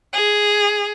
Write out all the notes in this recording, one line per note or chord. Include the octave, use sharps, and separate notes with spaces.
G#4